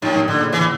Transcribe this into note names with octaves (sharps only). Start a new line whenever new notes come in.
D#2 A#2 D#3
A2
A#2 D3
C#3
D3 E3